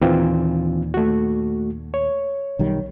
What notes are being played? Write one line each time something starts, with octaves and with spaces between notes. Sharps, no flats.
D#2 A#2 E3 C4 F4
A3 F#4
C#5
B1 D#3 G3